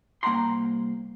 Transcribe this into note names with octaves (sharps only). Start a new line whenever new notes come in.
C2 A#3 F#5 G5 A#5 C6